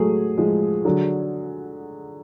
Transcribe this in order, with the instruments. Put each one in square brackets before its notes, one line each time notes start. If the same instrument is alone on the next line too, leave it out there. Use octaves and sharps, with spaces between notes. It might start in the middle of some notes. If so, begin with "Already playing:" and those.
Already playing: [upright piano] F#3 A3 [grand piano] G#4
[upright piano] F3 G#3
D3 F#3